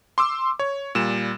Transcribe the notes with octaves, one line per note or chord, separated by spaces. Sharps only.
C6 D6 E6
C#5
A#2 G3 E7